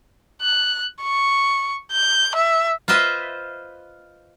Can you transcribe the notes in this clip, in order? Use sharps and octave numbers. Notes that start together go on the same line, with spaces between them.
F#6
C#6
G6
E5
F4 B4 C5 D#5 E5